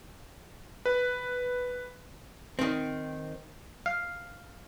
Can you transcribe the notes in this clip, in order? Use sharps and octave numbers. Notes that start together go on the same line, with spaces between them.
B4
D#3 C4
F5